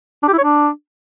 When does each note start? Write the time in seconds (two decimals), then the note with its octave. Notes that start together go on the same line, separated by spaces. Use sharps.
0.23 D4
0.28 G4
0.33 E4
0.38 C#5
0.43 D4